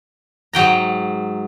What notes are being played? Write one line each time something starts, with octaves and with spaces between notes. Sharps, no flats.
G#2 F#3 G5 A#5